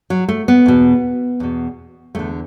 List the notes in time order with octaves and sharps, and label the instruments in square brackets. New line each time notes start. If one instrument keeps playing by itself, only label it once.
[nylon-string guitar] F#3
A3
B3
E2 B2
E2 B2
E2 D3 A3